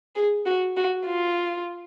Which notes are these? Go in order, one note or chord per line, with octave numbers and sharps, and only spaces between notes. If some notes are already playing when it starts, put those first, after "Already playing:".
G#4
F#4
F#4
F4